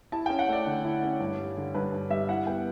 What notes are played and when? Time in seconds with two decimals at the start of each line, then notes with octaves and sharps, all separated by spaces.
0.12 E4 A5
0.26 C#4 G5
0.39 F#5
0.49 A3 D5
0.66 D3
0.84 E4
1.03 C#4
1.20 G2
1.39 G3
1.57 D3
1.74 G2 B4
1.92 G2
2.10 G3 E5
2.29 E4 F#5
2.47 B3 G5